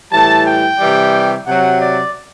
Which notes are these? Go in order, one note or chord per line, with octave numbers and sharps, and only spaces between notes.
A2 E3 G3 A5
G5
C3 E3 G3
C3 F#3 F#5
D5